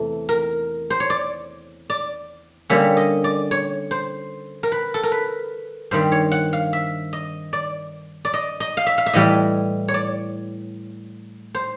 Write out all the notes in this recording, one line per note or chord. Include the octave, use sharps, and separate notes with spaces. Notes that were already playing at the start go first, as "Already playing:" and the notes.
Already playing: E2 C3 E3 A3 A4
A#4
C5
C#5
D5
D5
D3 G3 A#3 C#4 E5
D#5
D5
C#5
C5
A#4
B4
A4
A#4
B4
G2 D#3 G3 C4 C5
C#5
F#5
F5
E5
D#5
D5
D5
D#5
D#5
F5
E5
F5
E5
A2 E3 G3 D#5
C#5
D5
C5